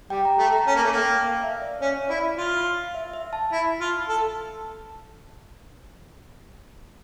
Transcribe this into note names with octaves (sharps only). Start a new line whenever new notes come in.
G3 G5
A#5
A3
A#5
C#4 A5
A#3
A3
A#3 G5
F5
E5
D5
C#4 C#5
E4 D5
F4 F5
E5
E5
A5
E4
F4
A4